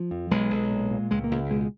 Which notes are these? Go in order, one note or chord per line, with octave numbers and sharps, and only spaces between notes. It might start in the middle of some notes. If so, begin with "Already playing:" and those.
Already playing: F3
F2
B1 G#3
B1
A#2
A#2
C#2 G#3
A#3
C#2
B2 G#3